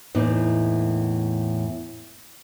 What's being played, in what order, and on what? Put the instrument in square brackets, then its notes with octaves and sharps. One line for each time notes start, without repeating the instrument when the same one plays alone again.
[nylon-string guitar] E2 A2 A#3 D#4